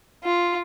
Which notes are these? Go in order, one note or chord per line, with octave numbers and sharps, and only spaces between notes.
F4